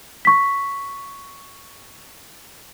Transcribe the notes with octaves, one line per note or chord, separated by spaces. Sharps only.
C#6 B6